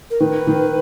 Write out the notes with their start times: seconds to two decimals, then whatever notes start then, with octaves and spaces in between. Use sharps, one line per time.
0.11 A#4
0.20 D#3 B4
0.47 D#3